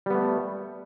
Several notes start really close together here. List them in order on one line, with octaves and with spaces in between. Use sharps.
G3 B3 A3